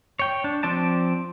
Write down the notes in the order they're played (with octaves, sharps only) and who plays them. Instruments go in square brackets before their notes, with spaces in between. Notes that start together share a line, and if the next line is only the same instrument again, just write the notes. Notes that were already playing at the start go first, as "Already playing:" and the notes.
[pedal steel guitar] C#5 G5
D4
F3 C4 D5 A5